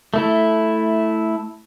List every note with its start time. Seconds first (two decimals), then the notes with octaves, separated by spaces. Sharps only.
0.14 A3 E4